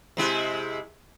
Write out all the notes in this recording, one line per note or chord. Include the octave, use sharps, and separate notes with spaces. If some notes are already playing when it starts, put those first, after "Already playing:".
C3 G#3 E4